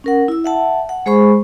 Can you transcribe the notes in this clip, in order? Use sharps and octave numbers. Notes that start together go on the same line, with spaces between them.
C#4 A#4 F#5
E4 E6
E5 F#5 A5
F#5
G#3 G#4 C5 B5 C#6